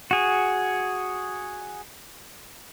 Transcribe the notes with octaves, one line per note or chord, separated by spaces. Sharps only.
F#4 G#4